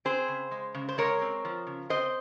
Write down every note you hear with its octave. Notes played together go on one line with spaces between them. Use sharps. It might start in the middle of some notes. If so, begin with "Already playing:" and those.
C4 G#4 C5
C#3
G#3
C#3
C5
G#3 A#4 C#5
C4
F3
C#3
C4 C5 D#5